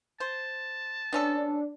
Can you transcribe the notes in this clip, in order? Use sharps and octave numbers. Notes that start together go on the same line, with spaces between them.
C5 A5
B3 C#4 D4 A4